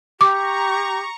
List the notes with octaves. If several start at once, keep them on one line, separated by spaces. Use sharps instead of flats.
G4 A#5 C#6 D6